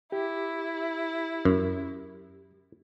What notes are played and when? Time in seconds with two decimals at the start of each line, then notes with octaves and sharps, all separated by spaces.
0.12 E4 G4
1.45 F#2